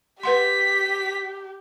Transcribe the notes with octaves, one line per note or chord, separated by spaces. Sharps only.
G4 B4 F#5 C6 B6